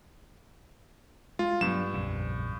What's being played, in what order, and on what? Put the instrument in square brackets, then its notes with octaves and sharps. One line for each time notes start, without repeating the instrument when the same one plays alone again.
[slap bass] G#3 [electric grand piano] F4
[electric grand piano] G2 E7 [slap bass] F#3 B3
[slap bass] A#1 F2 C#3